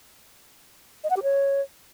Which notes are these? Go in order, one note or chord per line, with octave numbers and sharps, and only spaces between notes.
D#5
F#5
G4
C#5